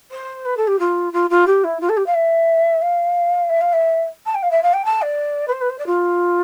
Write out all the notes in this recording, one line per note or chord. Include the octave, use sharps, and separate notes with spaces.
C5
B4
A4
G4
F4
F4
F4
G4
E4
F4
A4
G4
F5
E5
F5
E5
F5
E5
A5
G5
F5
E5
F5
G5
A5
D5
B4
C5
B4
C5
D5
F4